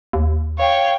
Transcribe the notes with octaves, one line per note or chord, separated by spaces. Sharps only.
D#2
C#5 F5 G5